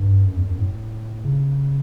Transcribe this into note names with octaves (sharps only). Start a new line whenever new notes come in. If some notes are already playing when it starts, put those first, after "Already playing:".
Already playing: G2
F#2
E2
F#2
A2
C#3